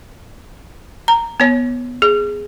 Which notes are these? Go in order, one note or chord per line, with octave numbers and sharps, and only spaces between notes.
A#5
B3 C#5
G#4